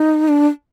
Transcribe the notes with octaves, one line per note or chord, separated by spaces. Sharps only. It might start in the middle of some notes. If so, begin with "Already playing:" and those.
Already playing: D#4
D4